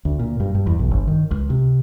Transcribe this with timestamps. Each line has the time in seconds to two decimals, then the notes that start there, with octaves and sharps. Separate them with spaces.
0.05 D2
0.19 A#2
0.40 G2
0.55 G2
0.67 E2
0.79 B1
0.91 G1
1.07 D#3
1.31 C#2
1.50 C3